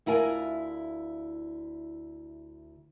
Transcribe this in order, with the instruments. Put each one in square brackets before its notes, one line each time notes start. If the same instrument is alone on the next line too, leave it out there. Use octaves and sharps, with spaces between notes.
[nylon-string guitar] D2 E4 F4 A#4 G#5